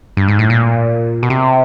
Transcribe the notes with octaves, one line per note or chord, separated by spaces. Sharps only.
G2
G#2
A2
A#2
B2
C3